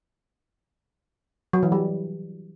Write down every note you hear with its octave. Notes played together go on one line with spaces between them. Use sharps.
F#3
E3
G3